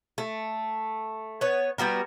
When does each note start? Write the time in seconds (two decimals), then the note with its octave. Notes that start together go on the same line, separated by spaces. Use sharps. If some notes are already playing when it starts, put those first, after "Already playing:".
0.18 A3
1.41 B3 C#5
1.78 G3 B3 F#4 A#4